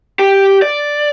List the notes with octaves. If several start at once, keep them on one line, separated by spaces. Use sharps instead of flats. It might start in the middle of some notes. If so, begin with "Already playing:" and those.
G4
D5